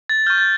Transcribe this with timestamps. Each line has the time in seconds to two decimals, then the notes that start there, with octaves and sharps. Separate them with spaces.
0.09 A6
0.26 C#6 F6 G6
0.38 A6